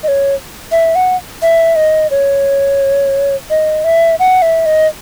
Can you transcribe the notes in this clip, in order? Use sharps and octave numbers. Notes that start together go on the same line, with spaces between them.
D#5
C#5
E5
F#5
E5
D#5
C#5
D#5
E5
F#5
E5
D#5